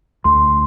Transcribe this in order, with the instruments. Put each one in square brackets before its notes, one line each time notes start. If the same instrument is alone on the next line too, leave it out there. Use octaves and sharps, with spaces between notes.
[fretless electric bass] D2 [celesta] C6